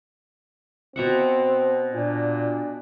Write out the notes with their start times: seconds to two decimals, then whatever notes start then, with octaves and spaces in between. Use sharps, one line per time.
0.96 B2 C4 E5 F#5
1.93 A#2 D4